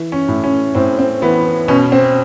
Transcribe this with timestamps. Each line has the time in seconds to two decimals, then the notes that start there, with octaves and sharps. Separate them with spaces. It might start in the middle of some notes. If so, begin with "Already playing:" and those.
Already playing: E3
0.12 C#4
0.29 A2
0.44 C#4
0.75 A2 C4
0.99 C4
1.22 E3 B3
1.68 B2 C#4
1.92 C4